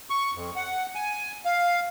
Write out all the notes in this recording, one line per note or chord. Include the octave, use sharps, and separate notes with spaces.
C#6
F2
F#5
G#5
F5